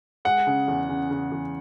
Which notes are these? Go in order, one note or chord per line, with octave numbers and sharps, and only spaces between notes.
G#3 F#5
C#3
E2
C#3
C#3
E2